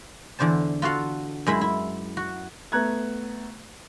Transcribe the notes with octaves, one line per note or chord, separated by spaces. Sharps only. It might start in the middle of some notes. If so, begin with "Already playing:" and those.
E2 D3 D4 C5 A5
F4 F#4 A4 F5 F#5
F#2 G#3 E4 B5
E4
F#4
A3 B3 A#5 F#6 G#6